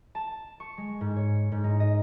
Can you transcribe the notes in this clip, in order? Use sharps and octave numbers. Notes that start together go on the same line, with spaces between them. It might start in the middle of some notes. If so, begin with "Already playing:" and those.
A5
C#6
G#3
G#2
C#5
G#2
D#4
D#5